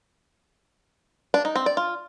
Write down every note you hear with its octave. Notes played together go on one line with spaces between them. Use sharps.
D4
D#4
C4
D5
F4